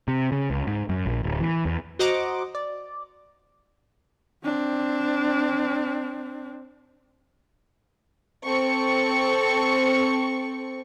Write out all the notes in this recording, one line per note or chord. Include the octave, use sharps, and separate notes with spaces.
C3
C#3
C#2
G#2
F#2
A#1
D1
E3
E2
F#4 C5 D#5 F#5 A#5 D6
D5
C4 D4
C4 A4 C#6